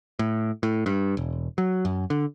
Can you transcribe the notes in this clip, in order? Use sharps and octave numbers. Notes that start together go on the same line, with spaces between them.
A2
A2
G2
E1
F#3
F#2
D3